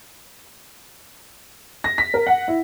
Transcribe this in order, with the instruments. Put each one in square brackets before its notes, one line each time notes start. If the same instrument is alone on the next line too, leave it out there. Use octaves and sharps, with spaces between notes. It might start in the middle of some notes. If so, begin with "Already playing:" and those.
[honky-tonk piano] A#6
B6
A#4
F#5
E4